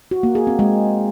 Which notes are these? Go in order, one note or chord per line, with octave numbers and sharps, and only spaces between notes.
F#4
A#3
G#4
C4
G#3